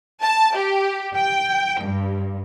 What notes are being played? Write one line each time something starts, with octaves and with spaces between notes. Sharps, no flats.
A5
G4
G5
G2